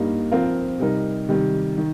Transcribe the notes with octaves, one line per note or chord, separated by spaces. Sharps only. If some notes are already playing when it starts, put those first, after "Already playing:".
Already playing: G2 G3 A#3 D#4
F3 C4 F4 A#4
C3 G3 D#4 A#4
C3 D#3 G3
D#3